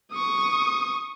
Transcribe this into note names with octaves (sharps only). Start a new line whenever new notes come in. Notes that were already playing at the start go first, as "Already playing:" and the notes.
C#6 D#6